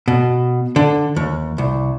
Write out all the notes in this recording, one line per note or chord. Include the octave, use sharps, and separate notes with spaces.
B2
D3
D#2
C2